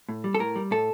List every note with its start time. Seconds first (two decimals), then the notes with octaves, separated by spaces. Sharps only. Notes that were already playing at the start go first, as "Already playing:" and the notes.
0.09 A2
0.24 G3
0.35 A4
0.39 A2 A#4
0.56 G3
0.71 A2 A4